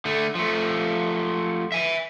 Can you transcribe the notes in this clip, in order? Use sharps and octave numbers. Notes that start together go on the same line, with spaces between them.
D3 A3
F3 A3
E5 G#5